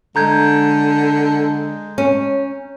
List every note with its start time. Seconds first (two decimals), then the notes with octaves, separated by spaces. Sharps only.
0.16 D3 G#3 A#5 G6 G#6
1.98 C#4